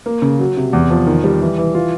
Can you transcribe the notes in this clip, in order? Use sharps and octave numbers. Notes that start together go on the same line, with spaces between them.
A#3
C#3
F#3
C3
E2
F3
D#3
G3
E3
E3
F4